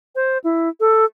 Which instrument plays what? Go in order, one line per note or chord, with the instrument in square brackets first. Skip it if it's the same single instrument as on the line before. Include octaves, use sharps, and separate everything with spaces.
[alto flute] C5
E4
A4